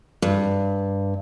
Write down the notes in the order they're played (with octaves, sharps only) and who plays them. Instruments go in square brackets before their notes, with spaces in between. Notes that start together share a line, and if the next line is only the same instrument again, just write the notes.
[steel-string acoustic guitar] G2